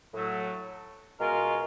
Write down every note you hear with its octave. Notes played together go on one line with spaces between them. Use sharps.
A2 F#3 A3
B2 G#3 C#4 F4 A#4